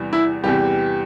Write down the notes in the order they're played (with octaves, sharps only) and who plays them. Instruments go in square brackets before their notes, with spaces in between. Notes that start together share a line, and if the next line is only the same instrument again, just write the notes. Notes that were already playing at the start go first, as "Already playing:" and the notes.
Already playing: [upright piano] E2 C3 E3 G3
[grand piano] E4
[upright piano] E2 C3 E3 G3 [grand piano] G4